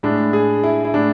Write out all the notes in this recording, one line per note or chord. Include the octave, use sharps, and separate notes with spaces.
A2 G#3 D4
G#4
E4
E4
A2 D4